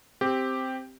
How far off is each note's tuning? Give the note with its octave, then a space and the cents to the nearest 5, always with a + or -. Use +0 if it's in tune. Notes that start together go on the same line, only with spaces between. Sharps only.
C4 +0 G4 +0